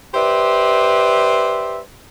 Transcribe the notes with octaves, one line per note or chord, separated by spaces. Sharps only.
G4 B4 C5 D5 E5